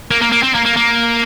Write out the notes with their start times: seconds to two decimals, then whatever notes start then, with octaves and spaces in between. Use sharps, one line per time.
0.11 A#3
0.22 A#3
0.32 A#3
0.43 C4
0.54 A#3
0.65 A#3
0.76 A#3